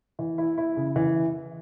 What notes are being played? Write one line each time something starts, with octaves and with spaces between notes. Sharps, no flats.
E3
E4
E4
C#3
E3